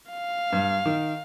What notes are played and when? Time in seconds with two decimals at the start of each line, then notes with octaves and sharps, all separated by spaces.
0.11 F5
0.53 G2
0.86 D#3